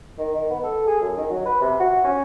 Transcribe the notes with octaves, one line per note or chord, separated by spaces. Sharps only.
D#3
D#3
B3
A4
G#4
F#2
D#3
F#3
B4
C3
F#4
C#4